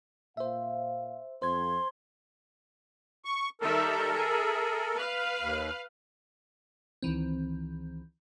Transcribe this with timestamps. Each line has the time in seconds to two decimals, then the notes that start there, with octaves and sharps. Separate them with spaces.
0.37 A#2 C5 E5 F5
1.42 F2 C5 C6 G#6
3.25 C#6
3.61 D#3 G3 A4 A#4 E5
4.14 G#4 E5
4.95 B4 F5
5.41 D#2
7.02 C#2 D#3 E3 C4